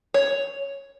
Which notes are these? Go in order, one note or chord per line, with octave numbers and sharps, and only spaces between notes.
C#5